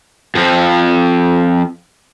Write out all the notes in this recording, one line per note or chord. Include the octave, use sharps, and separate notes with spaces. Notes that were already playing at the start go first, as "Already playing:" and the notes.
F2 F3